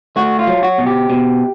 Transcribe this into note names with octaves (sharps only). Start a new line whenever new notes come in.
A3 F#4
F4
F#3
F#4
B2
G4
B2